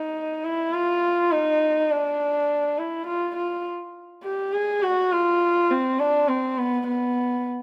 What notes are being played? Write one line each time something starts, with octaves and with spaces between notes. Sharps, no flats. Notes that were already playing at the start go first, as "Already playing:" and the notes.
Already playing: D#4
E4
F4
D#4
D4
E4
F4
F4
G4
G#4
F#4
F4
C4
D4
C4
B3
B3